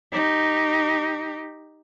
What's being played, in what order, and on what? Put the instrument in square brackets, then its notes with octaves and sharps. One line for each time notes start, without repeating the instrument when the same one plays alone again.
[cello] D#4 G4